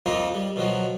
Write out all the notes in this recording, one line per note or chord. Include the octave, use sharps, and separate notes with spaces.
F2 F3 A#3 C4 D#4 F4
G3
B2 D#3 F3 F#3